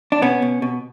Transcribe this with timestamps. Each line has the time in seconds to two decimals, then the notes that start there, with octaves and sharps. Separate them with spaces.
0.12 D4
0.22 B2 B3 C#4
0.42 B2
0.62 B2